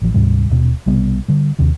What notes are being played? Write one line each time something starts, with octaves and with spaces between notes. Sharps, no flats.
A1 F3
D2 G#2 C3 G3
D#1 B2
B1 C3 G3 B3
D3 G3
D#2 C3 D#3